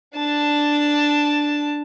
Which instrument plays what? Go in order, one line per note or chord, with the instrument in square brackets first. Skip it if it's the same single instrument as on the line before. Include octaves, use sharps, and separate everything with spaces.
[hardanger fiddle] D4 A5